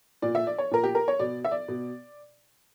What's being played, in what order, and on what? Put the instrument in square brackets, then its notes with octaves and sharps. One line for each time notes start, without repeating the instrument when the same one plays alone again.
[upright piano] A#2 D5
E5
D5
C#5
A#2 A#4
G4
A#4
C#5
B2 D5
E5
D5
B2